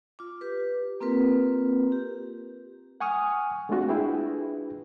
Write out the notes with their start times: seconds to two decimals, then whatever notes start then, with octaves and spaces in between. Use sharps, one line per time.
0.19 F4 D6
0.41 G4 B4
1.01 A#3 C4 F4 A#4 B4
1.92 G4
3.00 F#5 G#5 C#6 D#6 F6
3.69 G#3 A3 C4 D4 F4 F#4
3.89 D4 E4 F4 G#4 B4 G5